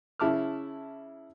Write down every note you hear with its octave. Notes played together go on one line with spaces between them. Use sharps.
C#3 E4 A5 D6 F6